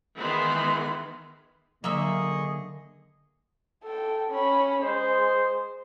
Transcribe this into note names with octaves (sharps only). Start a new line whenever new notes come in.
D#3 E3 G#3 B3 B5 C6
D3 F#3 A#3 G#4 D#5 E5 C#6
A4 G5
C#4 B5
G#3 C5